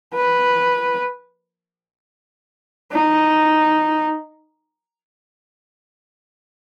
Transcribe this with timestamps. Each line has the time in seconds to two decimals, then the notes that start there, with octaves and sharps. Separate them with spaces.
0.14 B4
2.93 D#4